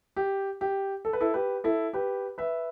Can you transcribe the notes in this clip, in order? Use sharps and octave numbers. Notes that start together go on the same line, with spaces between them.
G4
G4
A4
B4
E4 A4
G4 B4
E4 A4
G4 B4
B4 E5